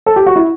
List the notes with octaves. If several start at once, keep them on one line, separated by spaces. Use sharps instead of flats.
A4
G4
F#4
E4